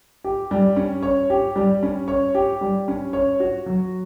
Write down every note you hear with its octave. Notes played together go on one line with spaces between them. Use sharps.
G4
G3
C#4
C#5
G4
G3
C#4
C#5
G4
G3
C#4
C#5
F#4
F#3